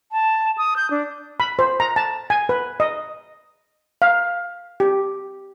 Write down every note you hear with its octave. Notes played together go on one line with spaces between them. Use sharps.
A5
D#6
G6
D4
B5
C5
A#5
A5
G#5
B4
D#5
F5
G4